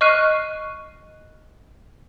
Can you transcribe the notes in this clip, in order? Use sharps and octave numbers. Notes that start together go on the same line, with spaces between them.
D#5 C#6 F6 F#6 C7 D#7